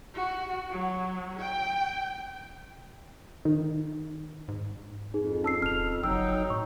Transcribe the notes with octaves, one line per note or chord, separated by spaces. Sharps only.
F#4
F#3
G5
D#3
G#2
F2 D#4 G#4
C#4 A5 E6 C7
D#1 F6 F7
G1 F#3 D#4 G5 E6
A2 C#6